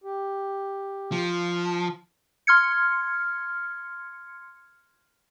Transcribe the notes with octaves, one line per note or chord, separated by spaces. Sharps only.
G4
F3
C6 F6 G#6 C#7